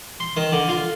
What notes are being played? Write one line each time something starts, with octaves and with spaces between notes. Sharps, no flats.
C6
D#3
D3
F4